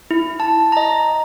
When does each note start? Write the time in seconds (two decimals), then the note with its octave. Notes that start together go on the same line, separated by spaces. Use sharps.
0.11 E4
0.40 A5
0.72 D#5 A#5